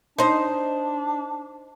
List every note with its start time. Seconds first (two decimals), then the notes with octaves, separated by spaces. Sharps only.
0.19 D4 D#4 C5